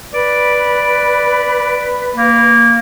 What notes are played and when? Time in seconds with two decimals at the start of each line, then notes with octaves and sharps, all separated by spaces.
0.13 B4 D5
2.16 A#3